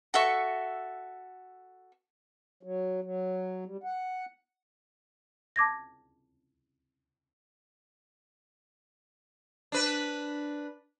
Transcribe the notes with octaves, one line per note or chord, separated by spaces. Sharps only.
F#4 A4 E5 C#6
F#3
F#3
G3
F#5
A5 D6 G#6 A#6
D4 B4